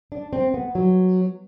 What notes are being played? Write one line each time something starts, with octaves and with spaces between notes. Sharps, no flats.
D4
C4
B3
F#3